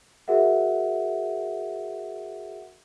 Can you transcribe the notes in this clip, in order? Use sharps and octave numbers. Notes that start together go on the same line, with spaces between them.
F#4 G#4 A#4 E5 F#5